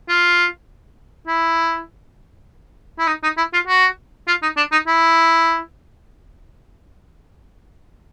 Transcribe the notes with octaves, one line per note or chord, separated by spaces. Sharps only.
F4
E4
E4
D#4
D#4
E4
F4
F#4
F4
D#4
D4
D#4
E4